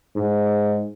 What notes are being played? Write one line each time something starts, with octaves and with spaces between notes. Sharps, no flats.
G#2